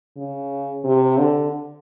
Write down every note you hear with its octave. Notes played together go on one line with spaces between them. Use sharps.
C#3
C3
D3